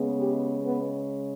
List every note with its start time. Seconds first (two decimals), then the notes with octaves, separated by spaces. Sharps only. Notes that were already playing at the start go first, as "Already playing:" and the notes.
Already playing: C#3 G#3 B3
0.18 G4
0.65 B3